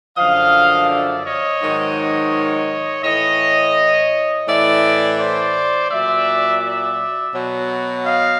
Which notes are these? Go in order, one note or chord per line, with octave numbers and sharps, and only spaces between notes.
F#2 D3 F3 D#5 F5
D5 E5
C#5 D#5
G#2 D#3 F#3
A2 E3 C#5 D#5
A2 E3 D5 E5
C5 D5
A#2 F#3 D5 E5
D5 E5
B2 F#3
D#5 F5